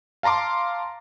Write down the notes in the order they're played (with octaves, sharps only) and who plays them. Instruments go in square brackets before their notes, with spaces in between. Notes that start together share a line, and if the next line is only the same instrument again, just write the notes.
[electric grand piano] F5 A5 A#5 C6 D6